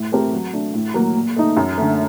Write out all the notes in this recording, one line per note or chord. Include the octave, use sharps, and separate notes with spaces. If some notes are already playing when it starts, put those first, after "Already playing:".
Already playing: A2
A3 C4 G4 A#4
F#3
A3 D4
A2
F#3 A#3
A#2
A3 D#4
F#2
D3 A3